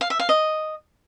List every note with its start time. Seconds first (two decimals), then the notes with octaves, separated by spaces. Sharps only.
0.01 F5
0.10 E5
0.19 F5
0.29 D#5